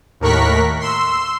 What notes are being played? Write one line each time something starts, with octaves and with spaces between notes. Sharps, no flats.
D#2 A2 A#4 C#6 F#6 B6
C6 E6